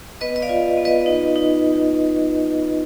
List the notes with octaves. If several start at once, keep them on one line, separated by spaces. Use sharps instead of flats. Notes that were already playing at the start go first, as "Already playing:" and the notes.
B3 B4 D#5
D#5
D5 F5
F4
B3
B4 D#5
D#4
D#4